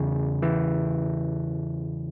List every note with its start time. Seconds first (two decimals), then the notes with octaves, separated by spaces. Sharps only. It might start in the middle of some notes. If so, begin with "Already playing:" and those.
Already playing: E2 C#3
0.42 E3